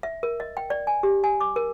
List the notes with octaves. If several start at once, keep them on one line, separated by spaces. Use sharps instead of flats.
E5
A#4
D#5
G5
D5
G#5
G4
G#5
D6
A#4